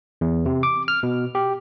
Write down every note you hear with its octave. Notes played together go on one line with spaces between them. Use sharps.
E2
C3
D6
F6
B2
G4